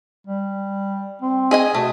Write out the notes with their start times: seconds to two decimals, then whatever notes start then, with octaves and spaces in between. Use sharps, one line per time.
0.27 G3
1.22 C4
1.51 G#4 D#5 G#5
1.75 B2 A3